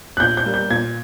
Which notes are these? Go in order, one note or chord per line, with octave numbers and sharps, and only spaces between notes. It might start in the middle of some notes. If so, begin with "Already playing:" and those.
F#6
A#2 G6
G6
G3 A#3
G6
A#2 G#6